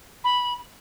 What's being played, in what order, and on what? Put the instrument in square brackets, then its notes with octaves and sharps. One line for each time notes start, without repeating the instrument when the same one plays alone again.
[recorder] B5